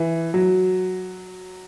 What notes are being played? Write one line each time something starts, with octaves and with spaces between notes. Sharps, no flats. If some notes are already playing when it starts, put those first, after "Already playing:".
Already playing: E3
F#3